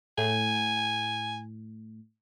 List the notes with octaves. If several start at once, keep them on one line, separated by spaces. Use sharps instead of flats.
A2 G#5